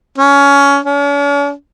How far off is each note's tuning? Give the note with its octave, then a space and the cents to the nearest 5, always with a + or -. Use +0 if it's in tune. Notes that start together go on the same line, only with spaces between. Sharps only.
C#4 +20
C#4 +45